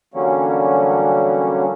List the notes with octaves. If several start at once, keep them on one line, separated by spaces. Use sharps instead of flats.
D3 E3 F#3 G3 A#3 C#4